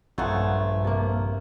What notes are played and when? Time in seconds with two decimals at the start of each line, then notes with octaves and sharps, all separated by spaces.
0.18 A#1 G2 A3 D#4 F4 F#4 C#5
0.85 C3 A#3